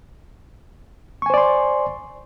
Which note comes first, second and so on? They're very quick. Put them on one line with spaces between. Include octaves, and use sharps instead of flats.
C#6 G#5 C5 D5 C6